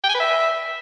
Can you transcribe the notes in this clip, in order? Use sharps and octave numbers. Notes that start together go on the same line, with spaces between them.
G5
G#5
B4
E5